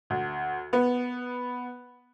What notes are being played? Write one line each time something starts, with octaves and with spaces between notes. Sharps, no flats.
D2
B3